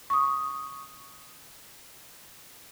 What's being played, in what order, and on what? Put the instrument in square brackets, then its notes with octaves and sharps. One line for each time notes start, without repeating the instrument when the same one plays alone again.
[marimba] C#6 D#6